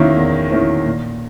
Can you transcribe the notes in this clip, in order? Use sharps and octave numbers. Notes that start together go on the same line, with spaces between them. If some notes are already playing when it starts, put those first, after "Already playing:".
Already playing: E2 D#3 A#3 C#4 E4
E2
D#3 A#3 C#4 E4
A#2